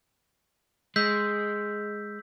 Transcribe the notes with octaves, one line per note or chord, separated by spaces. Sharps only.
G#3 E6 G6 B6